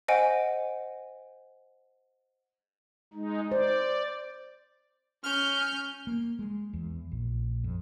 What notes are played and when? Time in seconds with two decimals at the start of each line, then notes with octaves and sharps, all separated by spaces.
0.08 C5 D#5 F#5 G#5 D7
3.14 G#3 D#4
3.52 C5 D5
5.24 C#4 F6 G6
6.07 A#3
6.39 G#3
6.73 E2
7.12 A#1
7.64 F2